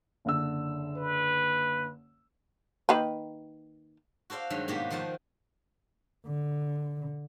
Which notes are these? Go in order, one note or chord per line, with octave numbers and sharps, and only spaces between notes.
F#1 D3 E6
B4
D#3 A#3 B4
F#4 A4 C5 D5 F5
G2 D#3 F#3 G#3
G#2 B2 A#3 B3 F#4 G4
D#3 F3 F#4 C5 A5
D3